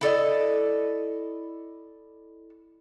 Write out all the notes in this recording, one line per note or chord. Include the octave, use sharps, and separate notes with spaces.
E4 A4 D5 D#5